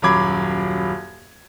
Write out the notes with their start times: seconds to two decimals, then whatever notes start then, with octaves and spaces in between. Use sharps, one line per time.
0.02 D#1 F#2 F#3 B5 D6 G#6